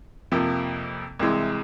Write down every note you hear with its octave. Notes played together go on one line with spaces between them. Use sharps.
F2 C3 F3 A#3
C2 C3 E3 G#3